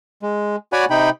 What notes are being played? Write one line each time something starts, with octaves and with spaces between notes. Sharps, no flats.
G#3
F#4 C#5 D5 F#5 G#5 B5
C3 D#4 G5 B5